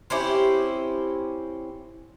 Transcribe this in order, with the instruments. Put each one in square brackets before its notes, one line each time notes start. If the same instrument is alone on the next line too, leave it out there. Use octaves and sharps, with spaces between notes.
[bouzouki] C4 C#4 E4 G4